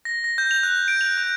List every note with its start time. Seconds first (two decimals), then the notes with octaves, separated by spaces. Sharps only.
0.05 A#6
0.24 A#6
0.38 G6
0.51 F7
0.63 F#6
0.88 D7
1.01 F7
1.18 G6